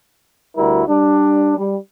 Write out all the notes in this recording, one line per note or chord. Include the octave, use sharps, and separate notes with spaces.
D2 G3 E4 F#4 A#4
G3 D4
G3